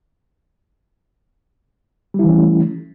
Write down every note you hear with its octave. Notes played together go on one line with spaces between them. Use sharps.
E3 G3 A3 C#4 E4